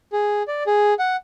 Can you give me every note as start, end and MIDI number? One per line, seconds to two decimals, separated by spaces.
0.12 0.43 68
0.48 0.63 74
0.67 0.94 68
0.99 1.16 78